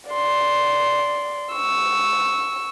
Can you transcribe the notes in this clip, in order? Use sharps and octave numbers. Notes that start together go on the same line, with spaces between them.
D5 C6
C#6 E6